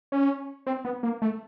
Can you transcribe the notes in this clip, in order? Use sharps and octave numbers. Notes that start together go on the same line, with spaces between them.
C#4
C4
B3
A#3
A3